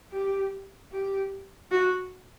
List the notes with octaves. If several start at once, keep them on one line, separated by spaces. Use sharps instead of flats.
G4
G4
F#4